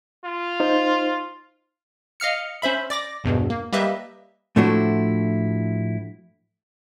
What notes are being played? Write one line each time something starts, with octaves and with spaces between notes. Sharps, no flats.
F4
D#4 C5
D#5 F5 F6 C#7
C#4 C5 E5 B5
D5 D6 A#6
A#1 E2 G2 B2
A#3
G3 A#3 G4 B4 D#5 E5
A2 F3 A3 D4 E4 F#4